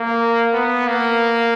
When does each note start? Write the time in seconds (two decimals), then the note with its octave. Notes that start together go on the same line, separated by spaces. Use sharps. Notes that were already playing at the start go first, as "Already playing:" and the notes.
Already playing: A#3
0.53 B3
0.88 A#3